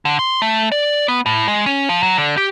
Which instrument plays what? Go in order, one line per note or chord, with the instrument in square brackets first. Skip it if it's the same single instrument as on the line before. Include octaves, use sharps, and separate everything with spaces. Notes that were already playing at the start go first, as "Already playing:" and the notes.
[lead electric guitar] D3
C6
A3
D5
B3
A2
G#3
C#4
F3
F#3
D3
G4